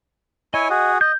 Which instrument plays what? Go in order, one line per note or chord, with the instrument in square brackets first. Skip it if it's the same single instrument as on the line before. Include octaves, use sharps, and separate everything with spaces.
[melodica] E4 C#5 G#5 [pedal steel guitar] D#5
[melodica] F#4 G#4
[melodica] D#5 [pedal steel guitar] G6